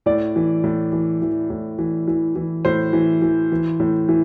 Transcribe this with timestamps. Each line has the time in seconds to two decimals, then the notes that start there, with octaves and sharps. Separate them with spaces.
0.06 A2 D5
0.36 E3
0.64 A2
0.92 E3
1.22 E3
1.50 A2
1.79 E3
2.08 E3
2.36 E3
2.65 A2 C5
2.93 E3
3.22 E3
3.52 E3
3.80 A2
4.09 E3